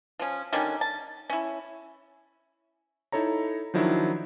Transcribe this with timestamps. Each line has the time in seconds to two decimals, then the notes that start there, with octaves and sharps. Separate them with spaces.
0.20 F3 C#4
0.53 D3 D#3 G3 C#4
0.81 A5
1.30 C#4 E4
3.12 D#4 E4 A4 C#5 A#5
3.74 D#3 F3 F#3 D4 E4